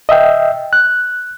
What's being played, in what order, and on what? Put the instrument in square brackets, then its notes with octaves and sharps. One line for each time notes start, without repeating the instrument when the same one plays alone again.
[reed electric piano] D#5 E5 G5
F#6